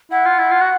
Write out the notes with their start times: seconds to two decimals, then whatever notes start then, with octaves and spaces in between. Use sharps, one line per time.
0.11 E4 F#5
0.26 F4
0.39 E4
0.51 F4
0.61 F#4